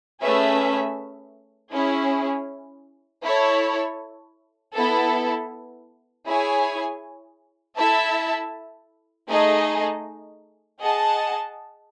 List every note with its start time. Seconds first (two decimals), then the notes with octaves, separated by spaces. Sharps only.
0.21 A3 C#4 G#4 B4 E5
1.72 C#4 E4 G#4
3.23 E4 A4 C#5
4.74 B3 E4 A4
6.26 E4 G#4 C#5 G#5
7.76 E4 A4 E5 A5
9.28 A3 D#4 G#4 D#5
10.80 G#4 D#5 F#5 A5